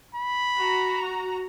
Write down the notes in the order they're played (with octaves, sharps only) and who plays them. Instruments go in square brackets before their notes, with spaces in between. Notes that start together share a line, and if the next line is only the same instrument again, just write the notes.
[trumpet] B5
[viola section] F#4 A#5